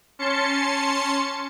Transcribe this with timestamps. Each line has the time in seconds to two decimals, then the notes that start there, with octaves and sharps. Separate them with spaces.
0.19 C#4 A5 C6 C#7